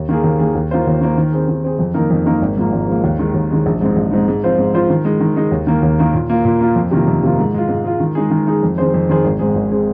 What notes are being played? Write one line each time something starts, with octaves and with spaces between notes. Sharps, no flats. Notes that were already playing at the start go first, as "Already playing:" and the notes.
Already playing: D#2
D#3 A#3 G#4
D#2
D#3 A#3 G#4
D#2
D#3 A#3 F4 C5
D#2
D#3 A#3 F4 C5
D#3
C4 G#4
D#3
C4 G#4
F2
D#3 A#3 D#4 A#4
F2
D#3 A#3 D#4 A#4
G#1
G#2 F3 A#3
G#1
G#2 F3 A#3
D#2
D#3 G#3
D#2
D#3 G#3
A#1
G#2 G#3 C4 D#4
A#1
G#2 G#3 C4 D#4
G#2
F3 C4 F4 C5
G#2
F3 C4 F4 C5
D#3
G#3 D#4
D#3
G#3 D#4
D#2
D#3 A#3
D#2
D#3 A#3
A#2
A#3 F4
A#2
A#3 F4
F2
C3 D#3 A#3 F4
F2
C3 D#3 A#3 F4
G#2
G#3 F4
G#2
G#3 F4
D#3
G#3 D#4 G#4
D#3
G#3 D#4 G#4
F2
D#3 C4 G#4 C5
F2
D#3 C4 G#4 C5
G#1
G#2 G#3 C4 G#4
G#1
G#3 C4 G#4